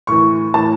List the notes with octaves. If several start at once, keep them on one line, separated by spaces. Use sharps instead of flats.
A2 E3 C#6
A2 E3 A5